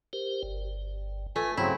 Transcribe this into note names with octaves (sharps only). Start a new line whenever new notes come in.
G4 A#4 C5
G1
A3 F4 B4 G#5
G2 C#3 F#3 C4 E4